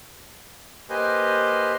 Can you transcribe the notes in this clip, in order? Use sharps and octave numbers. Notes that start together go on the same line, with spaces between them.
A#3 G4 B4 C5 D#5 G#5